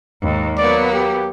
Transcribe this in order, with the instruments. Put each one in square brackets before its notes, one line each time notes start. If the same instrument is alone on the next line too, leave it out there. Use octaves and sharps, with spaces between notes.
[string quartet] D#2 G#2
[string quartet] F#3 A#3 B3 [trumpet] D5
[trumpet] G4